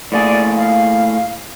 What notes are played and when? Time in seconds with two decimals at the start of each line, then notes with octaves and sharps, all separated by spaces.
0.12 A2 A#3 G#4 D5
0.57 F5